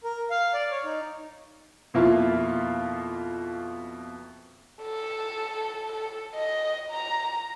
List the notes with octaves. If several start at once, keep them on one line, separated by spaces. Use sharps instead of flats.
A#4
F5
D5
C#5
D#4
F2 B2 A#3 E4 F4
A4
A4
D#5
A#5